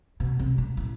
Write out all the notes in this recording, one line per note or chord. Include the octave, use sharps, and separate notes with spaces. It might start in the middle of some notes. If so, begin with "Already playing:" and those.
B2
C3
B2
A2